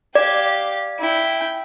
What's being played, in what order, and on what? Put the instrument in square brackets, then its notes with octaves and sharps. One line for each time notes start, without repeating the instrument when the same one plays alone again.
[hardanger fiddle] G4 F5 [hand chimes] D5
[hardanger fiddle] E4 G5